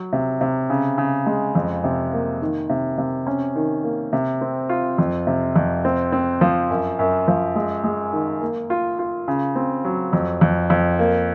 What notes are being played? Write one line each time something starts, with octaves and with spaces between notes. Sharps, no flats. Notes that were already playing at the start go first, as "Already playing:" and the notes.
Already playing: F#3
C3
C3
C#3
C#3
G#3
F2
C3
A#3
D#3
C3
C3
C#4
D#3
A#3
C3
C4
F4
F2
C3
F2
C4
C4
F3
F#2
F#2
F3
G#3
G#3
D#3
A#3
F4
F4
C#3
C4
F#3
F2
F2
F2
A#3